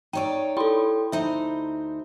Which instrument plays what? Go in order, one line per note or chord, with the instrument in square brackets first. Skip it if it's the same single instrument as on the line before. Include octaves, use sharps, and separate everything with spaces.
[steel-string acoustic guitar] D#4 C#5 D5 [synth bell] G5 C#6
[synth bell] E4 B5 C6 [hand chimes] A4 G5
[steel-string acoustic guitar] D2 D#4 C5 [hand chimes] E5